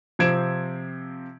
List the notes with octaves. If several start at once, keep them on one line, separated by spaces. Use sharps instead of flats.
C3 F3 C4 G#6 D7 E7